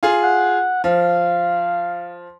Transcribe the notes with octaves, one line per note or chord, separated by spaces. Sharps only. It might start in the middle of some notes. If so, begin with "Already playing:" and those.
F4 G#4
F#5
F3 F5